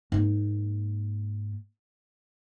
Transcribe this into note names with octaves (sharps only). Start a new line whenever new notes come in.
G#2 A#3